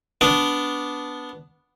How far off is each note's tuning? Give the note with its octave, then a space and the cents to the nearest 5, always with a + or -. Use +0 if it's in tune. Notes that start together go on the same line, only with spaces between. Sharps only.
B3 +0 D4 -15